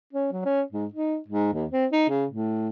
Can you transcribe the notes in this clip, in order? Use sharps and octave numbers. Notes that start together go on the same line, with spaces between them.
C#4
F#3
C#4
G#2
D#4
G#2
D#2
C4
D#4
C#3
A2